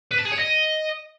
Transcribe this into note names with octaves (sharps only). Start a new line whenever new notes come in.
B4
A5
G#4
C#5
D#5